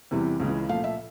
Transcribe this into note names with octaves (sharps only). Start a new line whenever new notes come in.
E2 C3 E3 G3
C#2 C#3 E3 G#3
A#2 F3 A3 F5
E5